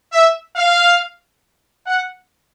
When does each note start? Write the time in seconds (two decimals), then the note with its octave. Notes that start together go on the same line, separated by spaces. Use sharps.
0.12 E5
0.56 F5
1.86 F#5